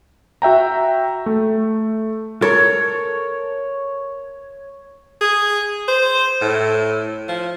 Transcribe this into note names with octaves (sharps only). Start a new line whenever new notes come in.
F#4 E5 G5 A#5
A3
A4 A#4 C#5
G#4
C5
A2
F3